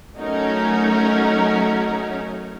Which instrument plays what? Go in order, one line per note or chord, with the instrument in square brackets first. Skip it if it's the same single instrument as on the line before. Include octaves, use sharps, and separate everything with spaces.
[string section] F#3 A3 C#4 D#4 F#4 A#4